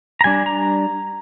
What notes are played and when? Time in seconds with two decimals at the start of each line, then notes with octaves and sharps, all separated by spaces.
0.21 A#5
0.24 G3 D4 G#5
0.46 A#5